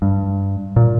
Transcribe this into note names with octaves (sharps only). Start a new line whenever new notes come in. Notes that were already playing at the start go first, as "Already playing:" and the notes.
G2
A#2